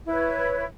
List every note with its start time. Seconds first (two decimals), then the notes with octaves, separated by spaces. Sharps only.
0.05 E4
0.08 B4
0.12 C#5